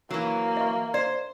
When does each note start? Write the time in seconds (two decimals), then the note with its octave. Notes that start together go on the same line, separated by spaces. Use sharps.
0.11 E3 F#3 A#3
0.57 E5 C#6
0.94 C5 D5